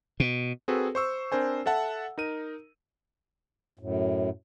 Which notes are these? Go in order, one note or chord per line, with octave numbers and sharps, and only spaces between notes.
B2
C4 F#4 G#4 A4 B4
C5 C#6 E6
C4 D4 A#4 C5 G#5
A4 E5 F#5 A5
D#4 A#4 D#7
F#2 A2